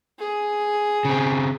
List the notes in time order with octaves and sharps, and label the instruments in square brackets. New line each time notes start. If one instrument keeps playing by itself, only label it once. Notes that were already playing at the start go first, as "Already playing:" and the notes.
[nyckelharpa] G#4
[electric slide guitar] C#3 C4